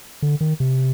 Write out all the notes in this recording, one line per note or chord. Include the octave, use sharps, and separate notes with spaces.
D3
D#3
C3